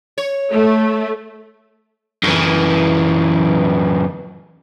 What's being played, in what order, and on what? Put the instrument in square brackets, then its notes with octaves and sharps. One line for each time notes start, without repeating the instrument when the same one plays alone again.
[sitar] C#5
[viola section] A3
[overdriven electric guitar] F#2 E3